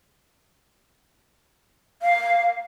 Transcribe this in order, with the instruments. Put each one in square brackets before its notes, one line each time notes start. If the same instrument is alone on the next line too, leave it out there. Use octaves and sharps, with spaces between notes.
[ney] F5